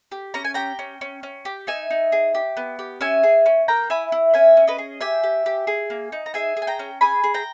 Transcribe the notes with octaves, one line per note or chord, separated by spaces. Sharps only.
G4
C#4 A#5
G#5
G4 G5 A#5
C#4
C#4
C#4
G4
D#4 E5 G#5
D#4
G#4
G4
B3
G4
C#4 E5 G#5
G#4
C#4
A#3 G5 A#5
E4 G#5 B5
E4
C#4 E5 G#5
C#4
B4 D#5
G#4
G4 E5 G#5
G4
G4
G#4
A#3
D#4
A#5
G#4 E5 G#5
G#4
G#5
G5 A#5
C#4
G#4 G#5 B5
G#4
G5 A#5